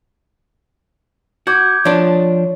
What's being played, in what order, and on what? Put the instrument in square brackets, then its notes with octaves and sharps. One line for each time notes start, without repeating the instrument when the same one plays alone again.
[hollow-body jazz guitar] F#4 [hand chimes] D6 G6 G#6
[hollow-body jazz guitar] F3 D4 [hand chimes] C#5